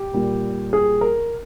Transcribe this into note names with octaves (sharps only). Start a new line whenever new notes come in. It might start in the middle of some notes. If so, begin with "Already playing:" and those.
Already playing: G4
A#2 G3 A#3
G#4
A#4